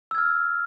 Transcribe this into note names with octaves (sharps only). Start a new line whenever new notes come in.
E6 F6 G#6